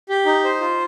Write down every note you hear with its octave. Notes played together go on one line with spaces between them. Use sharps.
G4
D#4
C5
F4